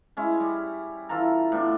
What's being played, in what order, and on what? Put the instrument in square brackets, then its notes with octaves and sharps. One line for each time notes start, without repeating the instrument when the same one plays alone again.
[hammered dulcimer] G#3 C#4 E4
G3
E3 F4 A4 A#5
A2 B3 D4